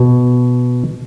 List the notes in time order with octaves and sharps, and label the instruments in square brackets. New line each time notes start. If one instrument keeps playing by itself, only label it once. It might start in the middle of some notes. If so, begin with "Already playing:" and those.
Already playing: [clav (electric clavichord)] B2